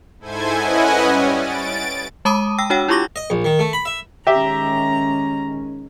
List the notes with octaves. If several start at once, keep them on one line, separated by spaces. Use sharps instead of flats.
G#2 E4 A4 C5 G#5 G#6
C#4 E4 B4 D#5 F#5 G#5
G3 C#4
A6 D7
G#3 A5 B5 D6 D#6 D#7
G5 E6 A#6
D4 F#4 C#5 F#5 G5
E4 F4 G4 C#6 D6 A#6
D#5
A#1
D#3
A3
B5
E5
D#3 G#3 C#4 G4 E5 A#5